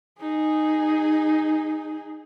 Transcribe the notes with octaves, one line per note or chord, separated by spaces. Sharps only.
D#4 G#4